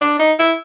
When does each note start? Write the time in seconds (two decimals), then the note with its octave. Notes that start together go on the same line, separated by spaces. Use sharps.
0.01 D4
0.20 D#4
0.39 E4